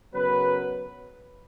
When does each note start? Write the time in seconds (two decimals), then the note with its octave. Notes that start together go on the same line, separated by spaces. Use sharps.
0.14 F#2 C#3 F#3 B3 B4